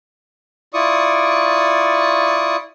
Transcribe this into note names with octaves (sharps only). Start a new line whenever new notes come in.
E4 F4 D5 C#6 D#6